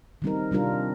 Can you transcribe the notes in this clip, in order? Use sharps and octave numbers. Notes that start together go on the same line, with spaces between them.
D#3 G3 C4 D#4 A#4
C3 G3 D4 F4 A#4